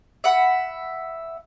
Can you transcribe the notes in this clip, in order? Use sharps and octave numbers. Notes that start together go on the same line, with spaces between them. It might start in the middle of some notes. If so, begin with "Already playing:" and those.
E5 F#5 B5